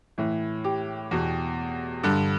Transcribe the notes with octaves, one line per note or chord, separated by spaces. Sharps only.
A2 E3
G4
E2 B2
G2 D3